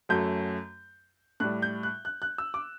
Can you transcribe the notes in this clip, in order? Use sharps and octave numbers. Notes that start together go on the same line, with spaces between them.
F#2 F#3 A3 G6
A2 G3 F#6
G6
F#6
F#6
F#6
E6
D6